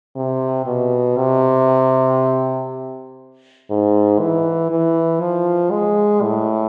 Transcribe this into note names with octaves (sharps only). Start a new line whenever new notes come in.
C3
B2
C3
G#2
E3
E3
F3
G#3
A2